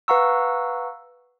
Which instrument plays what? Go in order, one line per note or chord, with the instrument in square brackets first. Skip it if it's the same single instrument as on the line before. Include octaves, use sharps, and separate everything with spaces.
[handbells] B4 F5 F#5 A#5 C#6 E6